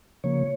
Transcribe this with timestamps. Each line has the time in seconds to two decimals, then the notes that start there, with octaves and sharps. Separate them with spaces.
0.24 C#3 F3 A#3 C#5